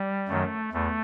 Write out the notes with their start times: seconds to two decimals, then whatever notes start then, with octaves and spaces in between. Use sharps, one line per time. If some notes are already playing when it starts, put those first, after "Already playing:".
Already playing: G3
0.28 F#2 D#3 F#3 A3
0.73 E2 A3